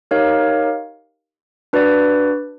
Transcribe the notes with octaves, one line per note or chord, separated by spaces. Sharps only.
D#4 G4 A#4 C#5 F5
D4 F#4 B4 D5